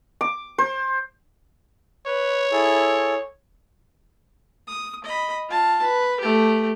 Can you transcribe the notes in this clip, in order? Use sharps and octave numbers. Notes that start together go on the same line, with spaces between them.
D6
C5
B4 C#5
E4 G#4 A4
D#6
D#5 B5
F4 A5
B4
A3 G4